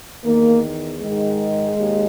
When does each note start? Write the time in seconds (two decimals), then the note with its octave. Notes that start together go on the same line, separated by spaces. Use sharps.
0.25 E2 D#3 A#3
1.01 G#2 D#3 G#3
1.78 D#2